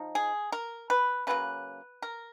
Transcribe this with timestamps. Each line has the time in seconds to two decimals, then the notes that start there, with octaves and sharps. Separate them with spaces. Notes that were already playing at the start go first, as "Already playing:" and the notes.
Already playing: F3 D#4
0.15 G#4
0.52 A#4
0.90 B4
1.27 C#3 F#3 A#3 B4
2.02 A#4